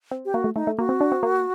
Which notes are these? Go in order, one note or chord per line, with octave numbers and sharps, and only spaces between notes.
C4
G4
A#3 F#4
A3
A3 D#4
A3
A#3 F#4
C4
D4
C4
A#3